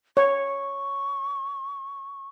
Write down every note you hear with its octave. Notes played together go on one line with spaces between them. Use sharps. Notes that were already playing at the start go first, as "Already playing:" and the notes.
C#5 C#6